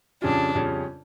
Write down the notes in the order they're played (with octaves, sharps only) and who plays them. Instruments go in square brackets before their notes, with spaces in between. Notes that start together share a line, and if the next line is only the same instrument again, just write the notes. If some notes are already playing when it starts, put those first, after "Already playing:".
[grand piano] F2 C#3 G3 C#4 F4 [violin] D4
[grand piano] F2 C#3 G3 C#4 F4